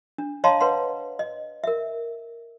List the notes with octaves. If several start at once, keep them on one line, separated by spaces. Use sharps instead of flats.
D4
C#5 D#5 F5 A5 A#5 C6
B4 C#5 F#5 C6
D#5
A#4 E5